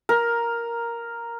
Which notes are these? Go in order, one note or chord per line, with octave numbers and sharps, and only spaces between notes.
A#4